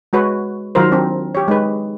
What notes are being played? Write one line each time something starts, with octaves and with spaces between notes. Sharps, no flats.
G#3 F#4 B4 C#5
D#3 F#3 F4 A#4 C5
F#3 C4 D4
G4 C#5
G#3 D#4 B4